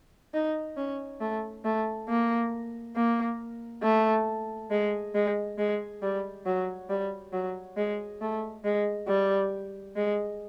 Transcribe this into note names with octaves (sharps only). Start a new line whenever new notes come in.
D#4
C#4
A3
A3
A#3
A#3
A3
G#3
G#3
G#3
G3
F#3
G3
F#3
G#3
A3
G#3
G3
G#3